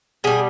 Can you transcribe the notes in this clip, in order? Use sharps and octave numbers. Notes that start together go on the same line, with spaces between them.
B2 G3 G#4